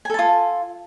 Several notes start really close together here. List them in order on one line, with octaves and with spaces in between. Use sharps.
G#5 A4 A5 F4